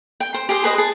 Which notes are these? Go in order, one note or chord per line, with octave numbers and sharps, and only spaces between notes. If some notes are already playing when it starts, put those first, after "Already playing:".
G5
C5
G4 G#4 C5
G#4 B4 C5 D#5
G#4 A5